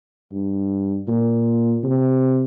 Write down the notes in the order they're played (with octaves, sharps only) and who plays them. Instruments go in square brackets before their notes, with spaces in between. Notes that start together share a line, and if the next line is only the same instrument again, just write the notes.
[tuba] G2
A#2
C3